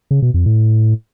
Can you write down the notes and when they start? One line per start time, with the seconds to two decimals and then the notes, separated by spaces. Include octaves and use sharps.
0.11 C#3
0.22 B2
0.34 F2
0.46 A2